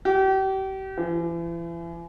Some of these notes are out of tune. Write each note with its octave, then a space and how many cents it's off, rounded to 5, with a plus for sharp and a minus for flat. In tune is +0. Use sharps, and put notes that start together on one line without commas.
G4 -35
E3 +40